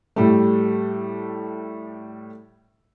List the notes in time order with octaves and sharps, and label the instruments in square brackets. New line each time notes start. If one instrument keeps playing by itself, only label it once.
[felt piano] A2 G3 A3